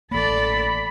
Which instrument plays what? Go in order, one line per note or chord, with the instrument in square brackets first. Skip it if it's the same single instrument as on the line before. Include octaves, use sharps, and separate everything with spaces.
[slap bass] A1 A#3 [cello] A4 D5 [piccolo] B5